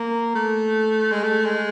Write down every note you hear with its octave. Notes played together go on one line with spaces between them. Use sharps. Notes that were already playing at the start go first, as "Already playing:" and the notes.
Already playing: A#3
A3
G#3
A3
G#3